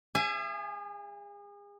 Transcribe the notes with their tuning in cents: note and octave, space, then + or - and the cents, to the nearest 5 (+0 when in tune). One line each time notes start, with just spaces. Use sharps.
G#4 -35 E5 +35 G#5 +10